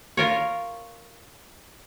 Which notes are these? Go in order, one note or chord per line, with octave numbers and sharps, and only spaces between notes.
F4 A#4 C#5